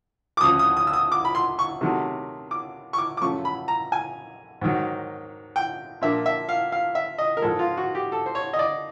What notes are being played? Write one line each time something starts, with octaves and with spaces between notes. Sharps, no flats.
D6
D2 C#3 F3 D#6
D#6
D#6
E6
D#6
D6
B5
C6
C#6
C3 D#3 F#3 A3
D6
C#6
D6
D6
F#2 C#3 F3 A3 C#6
B5
A#5
G#5
G#2 D#3 F#3
G5
A#2 F3 A#3 D4 E5
E5
F5
F5
E5
D#5
A#4
G#2 F3 G#3 A4
F4
F#4
G4
A4
C5
C#5
D#5
D5